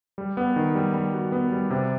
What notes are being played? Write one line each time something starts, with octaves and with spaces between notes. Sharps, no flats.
G3
B3
D#3
G3
G3
F#4
B3
G3
C3